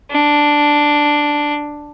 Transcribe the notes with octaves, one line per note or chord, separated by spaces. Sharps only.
D4